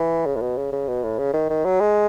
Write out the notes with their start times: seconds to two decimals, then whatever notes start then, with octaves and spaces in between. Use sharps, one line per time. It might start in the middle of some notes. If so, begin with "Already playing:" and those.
Already playing: E3
0.26 C#3
0.36 A2
0.41 B2
0.57 C#3
0.72 C#3
0.88 B2
1.03 A2
1.18 C#3
1.34 D#3
1.50 D#3
1.65 F#3
1.80 G#3